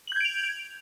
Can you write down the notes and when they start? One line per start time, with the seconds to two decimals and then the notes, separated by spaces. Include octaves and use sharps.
0.08 F#7
0.12 G6
0.16 G#6
0.21 D7
0.25 F7